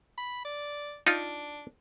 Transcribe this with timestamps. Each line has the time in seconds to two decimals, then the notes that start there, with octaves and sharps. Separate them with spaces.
0.18 B5
0.45 D5
1.07 D4 D#4 F4